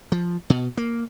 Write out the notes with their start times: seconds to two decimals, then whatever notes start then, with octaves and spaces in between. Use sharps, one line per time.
0.12 F3
0.50 B2
0.77 A#3